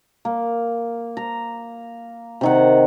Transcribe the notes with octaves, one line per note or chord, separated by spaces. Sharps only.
A#3
A#5
C3 D#3 F#5